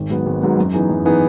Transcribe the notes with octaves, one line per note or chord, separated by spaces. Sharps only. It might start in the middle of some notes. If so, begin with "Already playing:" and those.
Already playing: G#1
G#2 F#3 B3
G#1
G#2 F#3 B3
F#2
E3 B3 D#4 G#4
F#2
E3 B3 D#4 G#4